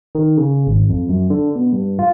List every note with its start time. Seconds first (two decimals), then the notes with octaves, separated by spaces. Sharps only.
0.15 D#3
0.37 C#3
0.67 G#1
0.90 F2
1.09 F#2
1.30 D3
1.55 B2
1.72 G2
1.99 F4